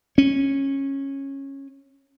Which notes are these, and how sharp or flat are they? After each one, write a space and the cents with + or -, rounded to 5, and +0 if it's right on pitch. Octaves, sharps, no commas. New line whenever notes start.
C#4 -15